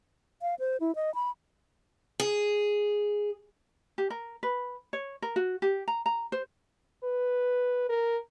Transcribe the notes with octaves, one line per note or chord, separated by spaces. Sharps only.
F5
C5
E4
D#5
B5
G#4
G4
A#4
B4
C#5
A#4
F#4
G4
A#5
A#5
C5
B4
A#4